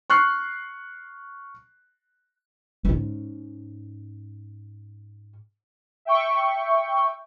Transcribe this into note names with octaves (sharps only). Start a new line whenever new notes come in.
C#6 F6 F#6 C7
G#2 C#4
E5 G5 C#6